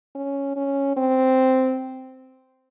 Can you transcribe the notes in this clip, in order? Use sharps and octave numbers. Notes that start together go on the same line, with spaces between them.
C#4
C#4
C4